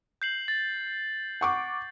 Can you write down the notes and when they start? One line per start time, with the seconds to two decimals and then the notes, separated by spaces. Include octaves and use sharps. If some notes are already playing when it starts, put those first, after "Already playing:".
0.22 G6 C7 F#7
0.48 A6
1.41 F#5 C#6 D6